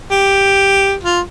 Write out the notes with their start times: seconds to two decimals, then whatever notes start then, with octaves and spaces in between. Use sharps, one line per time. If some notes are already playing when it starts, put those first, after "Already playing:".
0.11 G4
1.03 F4